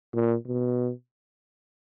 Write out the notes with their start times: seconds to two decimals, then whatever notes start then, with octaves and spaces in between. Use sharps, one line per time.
0.13 A#2
0.46 B2